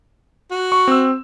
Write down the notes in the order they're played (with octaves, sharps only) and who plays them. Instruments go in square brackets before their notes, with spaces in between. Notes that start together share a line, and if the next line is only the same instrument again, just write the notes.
[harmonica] F#4
[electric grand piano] C#6
C4 E6